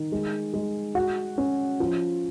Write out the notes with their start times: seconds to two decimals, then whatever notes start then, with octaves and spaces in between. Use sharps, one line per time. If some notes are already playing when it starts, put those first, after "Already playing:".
Already playing: D#3
0.12 G#3
0.54 G#3
0.95 F#4
1.38 C#4
1.80 F3